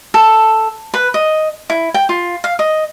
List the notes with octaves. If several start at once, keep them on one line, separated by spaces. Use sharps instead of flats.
A4
B4
D#5
E4
G5
F4
F5
D#5